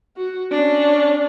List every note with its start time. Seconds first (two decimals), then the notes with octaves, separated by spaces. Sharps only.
0.17 F#4
0.52 C#4 D4